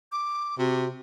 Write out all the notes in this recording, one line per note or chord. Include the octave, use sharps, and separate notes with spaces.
D6
C3 F#4